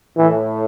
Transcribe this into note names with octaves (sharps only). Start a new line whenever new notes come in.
A2 E3